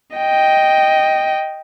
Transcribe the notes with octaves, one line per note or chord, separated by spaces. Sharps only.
D#5 G5